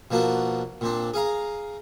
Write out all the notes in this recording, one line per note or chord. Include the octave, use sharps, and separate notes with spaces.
B2 F3 A#3 D4 F#4
A#2 C4 D4
G#4 F5 A#5